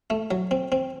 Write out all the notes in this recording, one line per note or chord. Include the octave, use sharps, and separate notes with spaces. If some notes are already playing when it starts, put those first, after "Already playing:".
A3
F#3
C4
C4